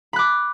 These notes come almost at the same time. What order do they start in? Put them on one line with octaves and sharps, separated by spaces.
B5 F#6 D6